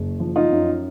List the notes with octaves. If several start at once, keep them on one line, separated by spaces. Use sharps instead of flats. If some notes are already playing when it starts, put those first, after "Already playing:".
Already playing: F#1
F3
D#4 F4
F#2